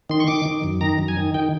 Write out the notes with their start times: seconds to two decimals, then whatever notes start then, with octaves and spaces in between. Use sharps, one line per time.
0.10 D#3 C6
0.20 C#6
0.28 D#3 D6
0.45 D#3
0.64 F#2
0.81 D#3 A#5
0.99 F#2
1.08 G#5
1.17 D#3
1.34 D#3 G5